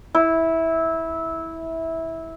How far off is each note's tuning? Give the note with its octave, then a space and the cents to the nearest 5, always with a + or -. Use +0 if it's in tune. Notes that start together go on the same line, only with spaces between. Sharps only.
E4 -15